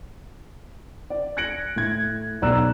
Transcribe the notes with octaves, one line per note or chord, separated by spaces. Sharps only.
D5
F#6 G#6 A#6 C#7 D7 F#7
A2 G#6
B1 D5 A#5 E6 F#6 E7